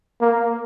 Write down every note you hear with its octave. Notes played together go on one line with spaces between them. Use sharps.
A#3